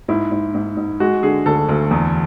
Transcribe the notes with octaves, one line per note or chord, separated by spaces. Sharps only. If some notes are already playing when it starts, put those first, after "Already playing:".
G#2 E4
G#2
G#2
G#2
G#3 F#4
D3 G#4
D2 A4
D2
E2